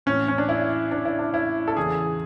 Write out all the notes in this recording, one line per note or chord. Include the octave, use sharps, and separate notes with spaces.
A2 E3 C#4
C#4
D4
E4
D4
E4
D4
E4
A4
E2 C#3 E3 G#4